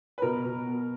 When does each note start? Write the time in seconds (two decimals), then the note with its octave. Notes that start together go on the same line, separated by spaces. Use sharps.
0.18 B4
0.22 B2 A#4
0.45 B2
0.66 B3